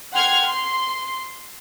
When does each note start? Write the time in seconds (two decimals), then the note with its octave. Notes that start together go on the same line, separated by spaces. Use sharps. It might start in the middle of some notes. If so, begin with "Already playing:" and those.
0.12 F#5 G5 C6 F6 G#6
0.44 C6